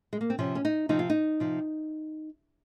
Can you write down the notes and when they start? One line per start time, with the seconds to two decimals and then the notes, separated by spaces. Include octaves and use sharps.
0.13 G#3
0.21 A#3
0.30 C4
0.39 C3 F3 C#4
0.55 C#4
0.65 D#4
0.89 C3 F3 D#4
0.99 F4
1.10 D#4
1.40 C3 F3